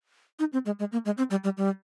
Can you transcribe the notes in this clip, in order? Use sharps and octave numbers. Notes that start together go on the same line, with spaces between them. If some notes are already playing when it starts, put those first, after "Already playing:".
D#4
C4
G#3
G#3
A#3
G#3
C4
G3
G3
G3